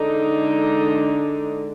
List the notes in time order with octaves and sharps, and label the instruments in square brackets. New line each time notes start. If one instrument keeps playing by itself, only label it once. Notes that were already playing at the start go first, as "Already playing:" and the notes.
Already playing: [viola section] D3 G#3 D4 D#4